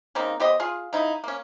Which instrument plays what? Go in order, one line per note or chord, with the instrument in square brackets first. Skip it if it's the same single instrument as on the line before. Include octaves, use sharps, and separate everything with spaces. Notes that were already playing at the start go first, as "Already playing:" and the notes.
[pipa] C#3 A#3 C4 D#4
B3 G4 C5 D#5
F4 G#4
C#3 D#4 E4
A#3 C#4